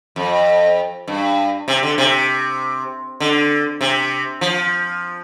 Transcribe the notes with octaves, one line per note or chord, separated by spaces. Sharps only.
F2
G2
C3
D3
C3
D3
C3
F3